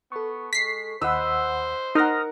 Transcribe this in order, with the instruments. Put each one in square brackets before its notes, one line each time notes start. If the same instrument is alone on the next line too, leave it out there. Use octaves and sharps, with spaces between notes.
[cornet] B3 [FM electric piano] A4 C#6
[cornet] G#3 [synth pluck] B6 C7
[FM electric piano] D#2 F#5 [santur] B4 D#5 E6 [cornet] C5
[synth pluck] D#4 [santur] A#4 F#5 [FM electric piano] D#6 F6 A#6